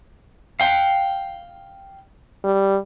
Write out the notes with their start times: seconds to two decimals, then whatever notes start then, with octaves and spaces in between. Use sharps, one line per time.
0.60 F5 G5
2.44 G3